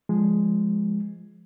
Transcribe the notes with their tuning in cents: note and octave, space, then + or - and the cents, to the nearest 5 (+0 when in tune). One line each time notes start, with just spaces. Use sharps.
F3 +0 G#3 +0